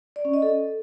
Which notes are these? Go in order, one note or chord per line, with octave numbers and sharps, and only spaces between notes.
D5
C#4
D#5
A4